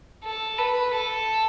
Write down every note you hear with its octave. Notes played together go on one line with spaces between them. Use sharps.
A4
B4
A4